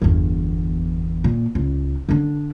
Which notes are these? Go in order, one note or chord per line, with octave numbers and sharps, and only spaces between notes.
G1 E2
A#2
C#2
D3 D4